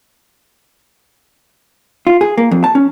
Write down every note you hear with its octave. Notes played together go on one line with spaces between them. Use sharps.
F4
G#4
A#3
F2
A5
C#4